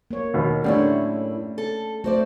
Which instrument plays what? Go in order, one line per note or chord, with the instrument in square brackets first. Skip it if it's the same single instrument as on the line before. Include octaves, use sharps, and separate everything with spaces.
[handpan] A#3 C#5
[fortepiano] D#2 B2
[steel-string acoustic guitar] F#2 A2 E4 [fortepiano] D3 G3 [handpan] A3 C#4 C#5
[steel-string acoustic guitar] A4
[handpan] A3 [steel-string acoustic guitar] F#4 C5 D5